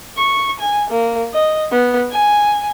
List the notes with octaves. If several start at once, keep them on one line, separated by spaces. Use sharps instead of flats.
C#6
G#5
A#3
D#5
B3
G#5